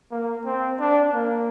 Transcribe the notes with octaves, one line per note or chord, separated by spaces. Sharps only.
A#3
C4
D4
A#3